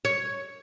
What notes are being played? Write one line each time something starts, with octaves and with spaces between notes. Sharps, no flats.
C#5